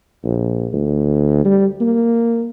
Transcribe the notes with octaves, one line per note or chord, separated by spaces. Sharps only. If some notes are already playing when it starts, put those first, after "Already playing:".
A#1
D2
G3
A#3